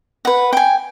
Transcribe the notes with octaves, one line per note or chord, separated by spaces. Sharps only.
B4 F#5
G5 G#5